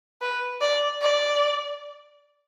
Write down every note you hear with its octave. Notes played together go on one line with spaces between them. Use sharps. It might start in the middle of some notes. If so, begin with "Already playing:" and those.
B4
D5
D5